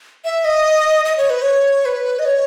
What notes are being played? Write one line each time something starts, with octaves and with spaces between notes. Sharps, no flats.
E5
D#5
D#5
C#5
B4
C#5
B4
D#5
C#5